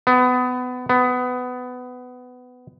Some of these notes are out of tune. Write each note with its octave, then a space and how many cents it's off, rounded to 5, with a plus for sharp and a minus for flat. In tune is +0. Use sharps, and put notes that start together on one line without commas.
B3 +25
B3 +20